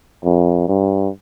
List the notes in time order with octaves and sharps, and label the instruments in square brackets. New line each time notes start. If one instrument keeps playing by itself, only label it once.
[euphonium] F2
G2